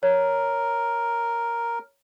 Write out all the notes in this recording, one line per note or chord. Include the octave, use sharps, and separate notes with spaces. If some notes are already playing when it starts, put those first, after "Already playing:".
A#4 C#5